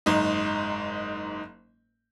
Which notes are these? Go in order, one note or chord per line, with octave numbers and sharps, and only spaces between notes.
F#1 G#2 D#4